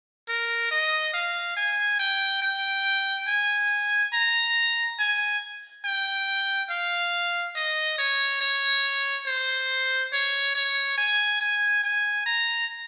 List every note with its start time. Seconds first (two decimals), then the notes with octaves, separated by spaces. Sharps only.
0.29 A#4
0.71 D#5
1.14 F5
1.57 G#5
2.00 G5
2.42 G5
3.28 G#5
4.14 A#5
4.99 G#5
5.85 G5
6.70 F5
7.56 D#5
7.98 C#5
8.41 C#5
9.26 C5
10.13 C#5
10.55 C#5
10.98 G#5
11.41 G#5
11.83 G#5
12.26 A#5